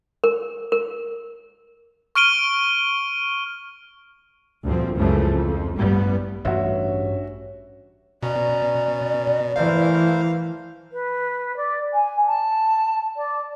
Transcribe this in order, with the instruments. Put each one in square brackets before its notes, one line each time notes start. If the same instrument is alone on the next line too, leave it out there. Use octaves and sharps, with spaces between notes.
[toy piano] A#4
A#4
[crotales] C#6 F6 D7 D#7 G7
[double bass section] D2 G2 A#2 F3 C4
C#2 F#2 C#3 E3 F3 A3
F2
A1 G2 G3 B3
[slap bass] A1 [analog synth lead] G2 [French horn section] C#4 C#5 [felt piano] F#4 E5
[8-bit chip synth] B2 [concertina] C#4 A#5 [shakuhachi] D5
[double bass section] E3 [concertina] A3 A#4 C5 [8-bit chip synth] F5
[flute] B4
D5
G#5
A5
D5